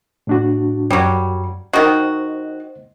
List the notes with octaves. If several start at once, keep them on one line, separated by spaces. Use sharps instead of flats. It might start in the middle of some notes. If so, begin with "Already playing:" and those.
A2 D4 F#4
F#2 F#3 G3
D#3 F#4 C5 D#5